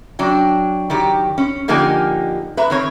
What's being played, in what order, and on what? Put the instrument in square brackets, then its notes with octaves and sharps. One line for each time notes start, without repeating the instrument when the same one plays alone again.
[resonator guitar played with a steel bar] F#3 D4 G5
D#3 F#3 G4
C#4
D3 F3 A#3 D#4 G4 G#5
B4 E5 A#5
D#3 C4 C#5